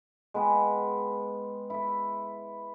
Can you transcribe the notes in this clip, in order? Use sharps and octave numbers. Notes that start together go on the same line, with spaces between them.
G#3 B3 B4 G5
E4 E5